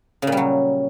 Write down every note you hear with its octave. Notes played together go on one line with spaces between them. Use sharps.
A#2 C#3 F#3 G3